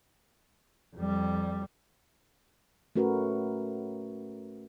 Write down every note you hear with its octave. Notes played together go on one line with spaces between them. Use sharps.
F2 G3
A3 C#4 F#4 A#4 B4